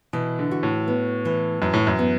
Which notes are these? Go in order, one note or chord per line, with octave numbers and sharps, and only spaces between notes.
B2 E3
D3
F#4
A2
B3
E3
F#2 E3
A2
F#2
B3